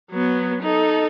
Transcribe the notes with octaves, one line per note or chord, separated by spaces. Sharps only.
F#3 B3
D#4 A4